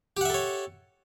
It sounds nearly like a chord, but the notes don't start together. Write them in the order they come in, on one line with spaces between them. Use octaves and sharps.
G4 F#5 E5 A4 C#5